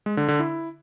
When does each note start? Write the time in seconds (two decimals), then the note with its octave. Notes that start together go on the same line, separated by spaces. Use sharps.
0.06 G#3
0.17 D3
0.28 D3
0.40 E4